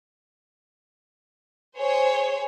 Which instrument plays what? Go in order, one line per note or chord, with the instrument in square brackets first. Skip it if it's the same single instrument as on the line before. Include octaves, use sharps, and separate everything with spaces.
[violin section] G#4 C5 C#5